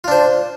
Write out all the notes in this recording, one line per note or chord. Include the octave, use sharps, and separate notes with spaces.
D4 F4 C5